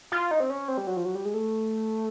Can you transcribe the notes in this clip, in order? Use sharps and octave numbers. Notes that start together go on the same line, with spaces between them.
F4
D#4
C4
C#4
C4
G3
F#3
F3
F#3
G3
G#3
A3